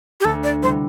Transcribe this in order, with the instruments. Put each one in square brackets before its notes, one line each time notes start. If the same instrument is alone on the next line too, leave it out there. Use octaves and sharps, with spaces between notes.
[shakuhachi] G4
[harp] D2 [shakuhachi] A4
[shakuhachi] D5
[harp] C3 G3 B3 E4 [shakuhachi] C5